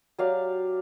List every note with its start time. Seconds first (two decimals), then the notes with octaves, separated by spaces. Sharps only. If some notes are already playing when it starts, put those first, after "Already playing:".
0.18 F#3 G4 D5 F5